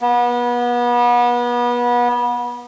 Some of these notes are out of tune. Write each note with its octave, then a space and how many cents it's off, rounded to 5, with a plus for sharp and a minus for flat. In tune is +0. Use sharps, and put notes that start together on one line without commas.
B3 -30